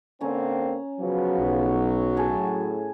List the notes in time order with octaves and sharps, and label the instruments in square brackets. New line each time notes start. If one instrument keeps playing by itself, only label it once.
[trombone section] D3 A#3 C4 [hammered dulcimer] C#4 A#5
[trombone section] C#3 F3 B3 [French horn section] F#3 F#4
[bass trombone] B1
[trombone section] A2 [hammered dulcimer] G#4 A5